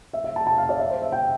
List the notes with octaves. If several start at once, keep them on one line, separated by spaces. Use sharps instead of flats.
E5
E5
A5
A5
F5
D5
E5
C5
E5
G5